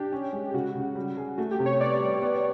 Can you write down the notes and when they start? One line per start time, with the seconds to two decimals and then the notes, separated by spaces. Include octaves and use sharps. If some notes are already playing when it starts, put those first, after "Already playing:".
Already playing: D4 G4
0.12 C#4
0.33 G#3
0.54 C#3 F#4
0.75 C#3
0.95 G3
1.17 G#4
1.38 A3 F#4
1.51 G4
1.59 C3
1.66 C#5
1.80 B3 D5
2.00 G3
2.22 B3